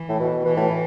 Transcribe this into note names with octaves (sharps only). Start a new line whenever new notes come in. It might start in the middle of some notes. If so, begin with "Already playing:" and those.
Already playing: E3
A2
B2
B2 E3
A2